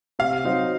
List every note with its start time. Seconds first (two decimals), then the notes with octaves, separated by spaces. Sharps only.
0.19 C3 F5
0.44 F#3 C4 D#4